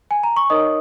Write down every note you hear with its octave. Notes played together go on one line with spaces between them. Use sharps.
G#5
A#5
C#6
D#4 A#4 C#5 D#5 D#6